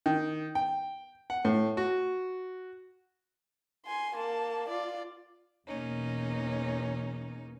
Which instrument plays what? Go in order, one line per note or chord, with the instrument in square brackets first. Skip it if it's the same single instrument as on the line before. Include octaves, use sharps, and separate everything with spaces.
[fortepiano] D#3
G5
F#5
A2
F#4
[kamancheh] G#5 C6
A#3 A5
F4 D5
[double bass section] E2 B2 [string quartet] A#3 C#4 D#4